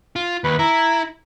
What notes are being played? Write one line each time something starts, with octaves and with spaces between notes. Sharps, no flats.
F4
D#2 B4
E4 A#5